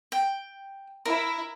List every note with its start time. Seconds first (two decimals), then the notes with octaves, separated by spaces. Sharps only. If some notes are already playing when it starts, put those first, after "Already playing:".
0.12 G5
1.05 E4 A#4